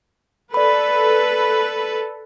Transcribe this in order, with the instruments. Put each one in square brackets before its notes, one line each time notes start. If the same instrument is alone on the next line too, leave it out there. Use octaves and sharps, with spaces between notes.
[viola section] A4 B4 [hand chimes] D5 B5